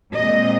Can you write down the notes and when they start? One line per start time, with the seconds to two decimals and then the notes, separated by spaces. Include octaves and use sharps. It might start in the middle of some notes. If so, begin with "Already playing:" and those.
0.12 A#2 G#3 C4 D#5